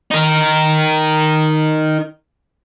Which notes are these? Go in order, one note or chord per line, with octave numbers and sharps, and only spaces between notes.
D#4 A#4